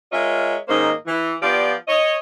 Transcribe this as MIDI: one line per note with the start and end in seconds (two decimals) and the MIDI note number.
0.13 0.56 56
0.13 0.56 65
0.13 0.56 70
0.13 0.56 73
0.13 0.56 75
0.13 0.56 76
0.68 0.92 44
0.68 0.92 51
0.68 0.92 58
0.68 0.92 61
0.68 0.92 72
0.68 0.92 75
1.06 1.35 52
1.42 1.74 53
1.42 1.74 59
1.42 1.74 65
1.42 1.74 67
1.42 1.74 74
1.88 2.16 73
1.88 2.16 75